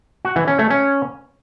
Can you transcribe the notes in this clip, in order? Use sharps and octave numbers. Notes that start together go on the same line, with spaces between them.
F#4
E3
C#4
A3
C#4